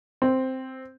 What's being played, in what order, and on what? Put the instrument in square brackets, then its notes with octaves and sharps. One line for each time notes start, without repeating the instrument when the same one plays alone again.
[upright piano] C4